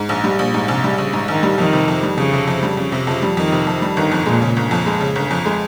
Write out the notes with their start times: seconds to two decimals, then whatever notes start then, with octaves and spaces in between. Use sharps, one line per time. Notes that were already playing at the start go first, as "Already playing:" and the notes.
Already playing: G#2
0.09 A#1
0.24 G3
0.39 A#1 A#2
0.54 G#2
0.68 A#1 C3
0.84 G3
0.98 A#1 C#3
1.13 G#2
1.28 A#1 D#3
1.43 G3
1.58 F2 D#3
1.73 C3
1.88 F2
2.03 G3
2.17 F2 C#3
2.33 C3
2.47 F2
2.63 G3
2.77 F2 C#3
2.92 C3
3.07 F2 C#3 F3
3.22 G3
3.37 F2 D#3
3.52 C3
3.67 F2
3.82 G3
3.96 G1 D#3
4.11 F2
4.26 A#2 G#3
4.42 C#3
4.56 G1
4.71 F2
4.86 G#3
5.00 C#3
5.16 G1
5.31 F2
5.46 G#3